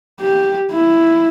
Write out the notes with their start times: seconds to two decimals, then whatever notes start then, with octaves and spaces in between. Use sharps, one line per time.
0.20 G4
0.71 E4